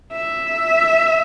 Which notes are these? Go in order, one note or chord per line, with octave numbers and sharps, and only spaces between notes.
E5